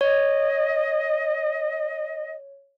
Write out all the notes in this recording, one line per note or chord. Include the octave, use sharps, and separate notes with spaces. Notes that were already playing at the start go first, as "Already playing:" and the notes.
C#5 D#5